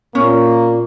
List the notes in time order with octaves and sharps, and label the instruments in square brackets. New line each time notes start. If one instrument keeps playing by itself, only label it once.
[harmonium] A#2 [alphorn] A#3 [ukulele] C#4